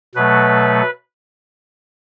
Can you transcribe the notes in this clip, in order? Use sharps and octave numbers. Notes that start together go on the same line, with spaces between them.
B2 F#3 A3 B4